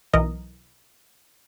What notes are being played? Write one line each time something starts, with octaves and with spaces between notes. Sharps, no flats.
B1 E3 A#4 D#5